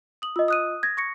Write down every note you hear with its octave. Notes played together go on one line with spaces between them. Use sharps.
D#6 F#7
F4 D#5 E6
D#6 F#6 D#7
G#6 A#6
C#6 A#6 C#7